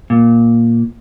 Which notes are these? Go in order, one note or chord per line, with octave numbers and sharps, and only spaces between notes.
A#2